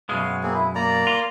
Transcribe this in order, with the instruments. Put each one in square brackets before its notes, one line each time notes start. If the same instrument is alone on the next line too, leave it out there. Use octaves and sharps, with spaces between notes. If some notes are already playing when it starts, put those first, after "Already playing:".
[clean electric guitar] F#2 B2 G#3 [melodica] F5
[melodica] A#3 C4 G#4
E4
A#3 D5 A#5
[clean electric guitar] F4